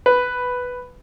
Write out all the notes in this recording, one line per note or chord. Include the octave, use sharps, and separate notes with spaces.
B4